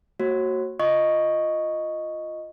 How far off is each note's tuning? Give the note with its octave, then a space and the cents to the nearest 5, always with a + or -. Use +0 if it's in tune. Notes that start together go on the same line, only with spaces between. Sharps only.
A#3 -25 F#4 +10 C#5 -40
F4 +0 D#5 +0 C#6 +0